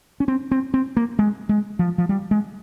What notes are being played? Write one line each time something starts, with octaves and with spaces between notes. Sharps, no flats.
C#4
C4
C4
C4
A#3
G#3
G#3
F3
F3
G3
G#3